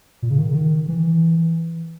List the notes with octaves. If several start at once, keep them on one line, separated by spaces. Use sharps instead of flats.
A#2
C#3
D#3
C#3
D#3
E3